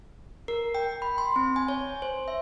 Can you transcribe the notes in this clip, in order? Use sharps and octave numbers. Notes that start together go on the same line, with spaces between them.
A#4
G5
B5
C6
C4
G#5
C#5
C5
E5